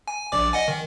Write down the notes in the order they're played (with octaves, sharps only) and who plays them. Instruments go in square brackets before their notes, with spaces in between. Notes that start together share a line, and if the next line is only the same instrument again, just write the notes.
[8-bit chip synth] G#5
A#1 D5 D6
D#5 F#5 G#5
D#3